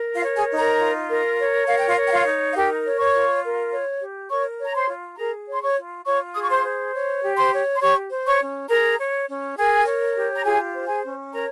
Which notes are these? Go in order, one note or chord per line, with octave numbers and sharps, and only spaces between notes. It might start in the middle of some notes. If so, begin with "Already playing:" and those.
Already playing: A#4
F4 F5
C#5
G#4 G#5
D#4
A#4 A#5
F4
A#4
C#5
A#4 F5
G5
F4 F5
C#5
G5
F4 F5
D#4
F5
G4 A#4 G5
C#5
C#5 C#6
F4
A#4
C#5
G4
A#4 C#5 C#6
C#5 A#5
C5 C6
F4
G#4 A#4 A#5
C#5
C6
C#5 C#6
F4
F4 C#5 C#6
G#4 D#6
C#6
C5 C6
C5
C#5
G4
C5 C6
C#5
C6
G4 C#5 C#6
C5
C#5 C#6
C#4
G#4 A#4 A#5
C#5
C#4
G#4 A#4 G#5
C#5
G4
A#5
F4 G#4 G#5
C5
G#4 G#5
C#4
A#4 C#5 A#5